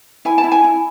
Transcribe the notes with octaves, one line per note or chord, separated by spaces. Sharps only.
E4 G#5
A5
E4
G#5
E4